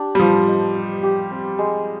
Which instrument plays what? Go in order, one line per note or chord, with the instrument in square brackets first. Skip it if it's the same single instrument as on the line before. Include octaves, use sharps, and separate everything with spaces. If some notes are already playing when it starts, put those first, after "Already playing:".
Already playing: [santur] D4 G4
[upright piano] G3
[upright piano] F3 [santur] C5
[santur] D#5
G4
G4
C4
G#3